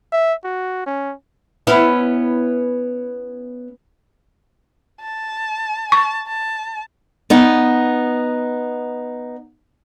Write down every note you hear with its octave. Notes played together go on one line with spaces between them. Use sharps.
E5
F#4
C#4
B3 C#4 E4
A5
A5 C#6
A5
B3 D#4